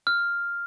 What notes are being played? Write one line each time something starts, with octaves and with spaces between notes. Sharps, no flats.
F6